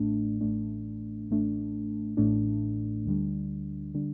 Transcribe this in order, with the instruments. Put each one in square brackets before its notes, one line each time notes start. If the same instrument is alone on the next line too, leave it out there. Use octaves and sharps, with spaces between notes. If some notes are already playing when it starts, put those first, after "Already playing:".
Already playing: [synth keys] A1 A2 A3 D4
A1 A2 A3 D4
A1 A2 A3 D4
A1 A2 A3 D4
D2 D3 G3 D4
D3 G3 D4